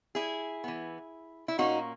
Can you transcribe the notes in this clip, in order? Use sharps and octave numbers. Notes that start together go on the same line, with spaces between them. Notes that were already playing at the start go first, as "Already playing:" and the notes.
E4 G#4
E3 B3
E4
A#2 A#3 C#4 D#4 F#4